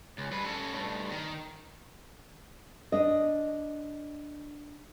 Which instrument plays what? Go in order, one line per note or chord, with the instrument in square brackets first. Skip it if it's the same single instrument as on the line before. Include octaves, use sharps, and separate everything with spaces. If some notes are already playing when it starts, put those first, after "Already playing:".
[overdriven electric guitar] C#2
G2 B4
C#4 A4
G2 A3
D#3
[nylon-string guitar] D4 D#5